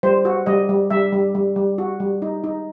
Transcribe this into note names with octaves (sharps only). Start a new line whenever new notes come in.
G3 C5
F#4
G3 D#5
G3
G3 E5
G3
G3
G3
F#4
G3
D#4
D#4